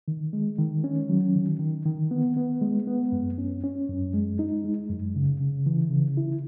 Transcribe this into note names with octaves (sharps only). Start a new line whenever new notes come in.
D#3
G#3
D#3
C#4
F#3
D#3
D#3
D#3
B3
B3
G#3
B3
F#2
C#4
C#4
F#2
G#3
D#4
G#3
F#2
C#3
C#3
E3
C#3
E4